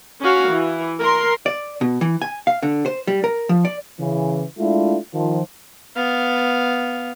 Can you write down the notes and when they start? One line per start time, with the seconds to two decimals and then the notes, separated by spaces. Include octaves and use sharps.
0.21 C#4 F#4 F5
0.50 E3
0.99 A#4 C6
1.46 D5
1.81 B2
2.01 E3
2.22 G#5
2.47 F5
2.63 D3
2.86 C5
3.07 G3
3.24 A#4
3.49 F3
3.65 D5
4.00 C#3 E3
4.58 G#3 A3 D4 E4 F4
5.14 D#3 F3
5.96 B3 F5